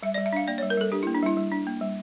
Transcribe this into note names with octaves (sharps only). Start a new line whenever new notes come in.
G3 E5
G3 D5
E5
D4 F5
A#3 D5
G3 C#5
A#4
G3 A4
D4 G4
A#3 E4
D4
G3 E4
G3
D4
A#3
G3